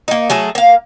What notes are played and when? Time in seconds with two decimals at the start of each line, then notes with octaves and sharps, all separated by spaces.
0.08 A#3 D#4
0.30 F#3 A3 G#4 A4
0.55 A#3 F5